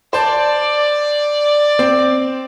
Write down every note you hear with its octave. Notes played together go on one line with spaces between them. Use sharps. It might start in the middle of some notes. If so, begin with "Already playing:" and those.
C5 D5 A5
C4